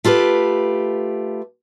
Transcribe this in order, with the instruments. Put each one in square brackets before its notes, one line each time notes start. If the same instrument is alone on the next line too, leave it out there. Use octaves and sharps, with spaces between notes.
[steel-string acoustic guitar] A3 F4 G4 B4